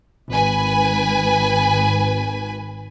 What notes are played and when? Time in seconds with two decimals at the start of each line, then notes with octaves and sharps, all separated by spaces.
0.29 G#1 B4 G#5